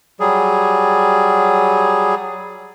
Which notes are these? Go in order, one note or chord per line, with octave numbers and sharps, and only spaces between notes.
F#3 G3 G#4